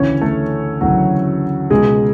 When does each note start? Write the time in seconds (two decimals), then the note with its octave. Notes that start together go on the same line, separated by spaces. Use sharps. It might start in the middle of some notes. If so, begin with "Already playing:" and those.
Already playing: D2 C#3 E3 C#4 C#5
0.21 A3 A4
0.81 D2 C#3 E3 F#3 F#4
1.70 C#2 B2 G#3 G#4